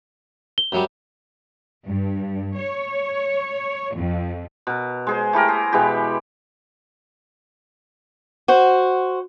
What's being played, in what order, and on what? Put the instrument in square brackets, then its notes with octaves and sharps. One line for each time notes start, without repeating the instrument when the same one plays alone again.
[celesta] G7
[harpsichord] F#2 F#3 G3
[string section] G2
C#5
F2
[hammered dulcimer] B2 A#4
G#3 G#4 C5
A3 E4 G4 A#4
G#4
B2 E3 G#3 G4
[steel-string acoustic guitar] F#4 C5